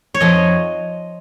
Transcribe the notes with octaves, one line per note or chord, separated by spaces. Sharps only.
C#5
F2 D#5